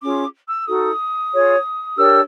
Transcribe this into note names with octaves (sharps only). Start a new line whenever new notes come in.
C#4 F4 G#4 D6
E6
D#4 F#4 A4 D#6
F4 G#4 C#5
D4 G4 A#4 C#5 E6